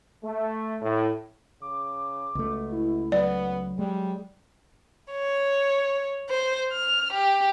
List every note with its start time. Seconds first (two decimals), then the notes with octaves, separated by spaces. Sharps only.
0.24 A3
0.82 A2
1.62 C#3 D6
2.35 C#2 B2 A3
2.72 E4
3.12 F#3 B3 D5
3.79 G3 G#3
5.12 C#5
6.29 C5
6.73 F6
7.13 G4